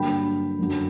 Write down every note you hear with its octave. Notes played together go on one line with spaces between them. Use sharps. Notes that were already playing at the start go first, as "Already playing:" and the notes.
Already playing: G2 D3 F#3 A#3 G5 B5
F#2 D3 F#3